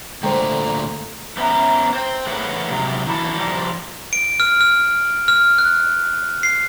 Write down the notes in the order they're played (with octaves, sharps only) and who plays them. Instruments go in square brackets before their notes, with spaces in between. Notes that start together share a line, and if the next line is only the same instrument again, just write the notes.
[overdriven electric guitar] D2 A#2 [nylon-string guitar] A3 [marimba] C5 G5 [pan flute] A#5
[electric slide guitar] A3 B3 C#4 E5 A#5
C5 G5
A3 G#4 B4 C#5 F#5
C3 F#3 G#3
D#3 E3 E4 F#4 G#4 A4
F3 G3 D#4
[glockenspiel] D7
F6
F6
F6
F#6
C7